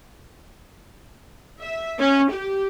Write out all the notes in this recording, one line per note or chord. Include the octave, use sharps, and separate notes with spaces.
E5
C#4
G4